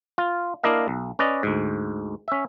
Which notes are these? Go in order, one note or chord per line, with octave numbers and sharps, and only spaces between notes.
F4
A#3 D4 E4 A#4 D#5 F5
B1
C#4 B4 D5 D#5
D2 G#2
C#4 E5